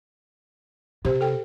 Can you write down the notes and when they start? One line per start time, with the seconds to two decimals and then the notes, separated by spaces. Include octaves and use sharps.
1.05 C3 G4 C5
1.21 A4 G5